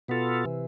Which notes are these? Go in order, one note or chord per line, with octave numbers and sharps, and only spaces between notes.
B2 B3 F4 A4
C3 E3